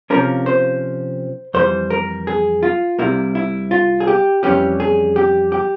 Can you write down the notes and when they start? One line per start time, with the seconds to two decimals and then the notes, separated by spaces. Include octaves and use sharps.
0.10 C3 F3 A#3 C#4 A#4
0.46 C5
1.54 F2 E3 G3 C5
1.90 A#4
2.27 G#4
2.63 F4
2.99 C2 C3 G3 A#3 E4
3.35 E4
3.71 F4
4.00 G#4
4.07 G4
4.43 F2 E3 G3 C#4 G4
4.80 G#4
5.16 G4
5.52 G4